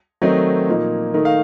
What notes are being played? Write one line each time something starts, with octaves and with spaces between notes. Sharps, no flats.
D#3 F#3 A3 C4 D#4
A#2 F3 A#3 D#4
D#3 A3 D#4
F5